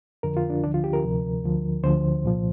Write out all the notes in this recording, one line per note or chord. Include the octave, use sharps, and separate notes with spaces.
F2 D3 F3 A#4
F4
D4
D2 D3 F3 D4
F4
G4
A#4
D2 C3 F3
D2 D3 F3
D2 D3 F3 C5
C2 A#2 F3